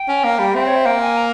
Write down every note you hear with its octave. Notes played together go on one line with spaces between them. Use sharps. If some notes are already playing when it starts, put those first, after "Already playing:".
Already playing: G5
C#4
A#3
G3
C4 E5
C#5
E5
A#3 G5
G#5
A#5